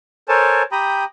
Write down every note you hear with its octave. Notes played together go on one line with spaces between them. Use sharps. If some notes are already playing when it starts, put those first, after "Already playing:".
A4 A#4 C5 C#5 G#5 A5
G4 G5 A#5 B5 D#6